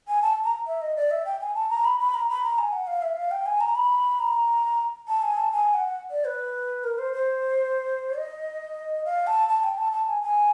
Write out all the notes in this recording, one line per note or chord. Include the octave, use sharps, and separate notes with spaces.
G#5
A5
A#5
E5
D#5
D5
E5
G5
G#5
A5
A#5
B5
B5
A#5
B5
A#5
G#5
F#5
F5
E5
F5
G5
G#5
A#5
B5
A#5
A5
G#5
A5
G#5
F#5
D5
B4
A#4
C5
C5
D#5
F5
A5
A5
G5
A5
A5
G#5
G#5